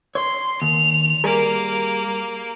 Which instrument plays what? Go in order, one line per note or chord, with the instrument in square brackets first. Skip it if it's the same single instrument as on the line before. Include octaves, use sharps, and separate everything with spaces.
[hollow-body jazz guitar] C#5 [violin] C6
[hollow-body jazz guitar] D#2 [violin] F7
[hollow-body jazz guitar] G3 G#4 A#4 [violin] A#3 D6